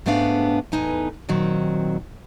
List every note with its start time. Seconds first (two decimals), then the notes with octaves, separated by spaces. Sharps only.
0.06 G#2 C#3 A3 B3 D4 F5
0.72 E2 A2 D#4 B4 G#5
1.29 A#2 D#3 F#3 C4